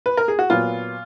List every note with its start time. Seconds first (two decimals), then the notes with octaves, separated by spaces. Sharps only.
0.06 B4
0.17 A#4
0.28 G#4
0.39 F#4
0.50 A#2 F#3 B3 F4